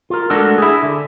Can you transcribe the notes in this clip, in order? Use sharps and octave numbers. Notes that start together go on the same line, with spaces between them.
F4 A#4
G#3 A3 D4 F#4 A4 A#4
E4 G#4
D3